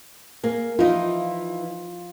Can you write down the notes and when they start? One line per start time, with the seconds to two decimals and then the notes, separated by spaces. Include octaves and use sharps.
0.43 A#3 G#4
0.79 E3 D#4 F4